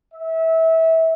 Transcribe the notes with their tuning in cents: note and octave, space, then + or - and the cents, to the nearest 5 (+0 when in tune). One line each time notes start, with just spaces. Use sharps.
E5 -25